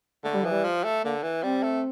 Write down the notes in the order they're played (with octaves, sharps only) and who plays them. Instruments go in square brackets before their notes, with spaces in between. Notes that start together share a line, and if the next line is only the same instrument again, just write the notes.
[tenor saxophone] D3 [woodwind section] A3
[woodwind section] G3
[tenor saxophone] E3 [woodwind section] F3
[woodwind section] G3
[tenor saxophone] F3
A3
[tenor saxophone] D3 [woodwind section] A#3
[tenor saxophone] E3
[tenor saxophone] G3 [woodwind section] C4
[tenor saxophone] A3